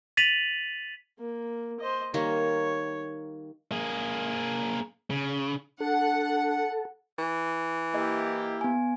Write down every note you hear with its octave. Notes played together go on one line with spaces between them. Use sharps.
A6 B6 D#7 F7 F#7
A#3
C5 D#5
D#3 G3 A#3 C#5
A#3 G#4
C#3
D4 A4 F#5
E3
A#3 E4 G4 D#5
B3 G#5